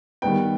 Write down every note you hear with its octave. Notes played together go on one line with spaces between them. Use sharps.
D#3 G3 B3 G5